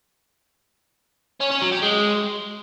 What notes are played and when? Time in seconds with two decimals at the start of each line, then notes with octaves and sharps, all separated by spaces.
1.40 C#4
1.51 C#4
1.61 F#3
1.72 G4
1.82 G#3